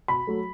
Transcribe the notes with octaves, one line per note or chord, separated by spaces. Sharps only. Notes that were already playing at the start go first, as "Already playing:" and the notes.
B2 B5
F#3 A3